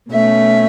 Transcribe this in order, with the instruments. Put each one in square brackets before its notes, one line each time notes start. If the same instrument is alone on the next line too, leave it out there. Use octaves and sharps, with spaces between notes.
[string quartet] B2 A3 C#4 E5